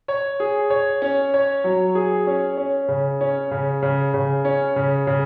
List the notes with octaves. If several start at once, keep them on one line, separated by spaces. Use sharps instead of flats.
C#5
G#4
C#5
C#4
C#5
F#3
G#4
C#4
C#4
C#3
C#4
C#3
C#3
C#3
C#4
C#3
C#3